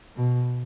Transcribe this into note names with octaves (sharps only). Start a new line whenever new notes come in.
B2